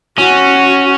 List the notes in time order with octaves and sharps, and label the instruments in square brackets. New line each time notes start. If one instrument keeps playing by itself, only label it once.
[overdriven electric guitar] C#4 [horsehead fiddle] F#4